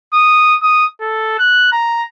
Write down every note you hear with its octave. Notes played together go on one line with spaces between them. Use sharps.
D#6
D#6
A4
F#6
A#5